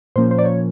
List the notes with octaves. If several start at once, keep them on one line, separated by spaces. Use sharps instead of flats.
A#2 F3 A#3 C#4 C5
C5
D5
C#5